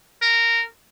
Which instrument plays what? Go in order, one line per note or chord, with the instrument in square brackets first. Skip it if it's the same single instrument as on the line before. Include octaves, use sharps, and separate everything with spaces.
[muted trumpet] A#4